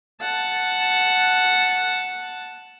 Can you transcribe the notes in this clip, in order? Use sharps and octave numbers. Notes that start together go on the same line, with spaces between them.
F#5 A5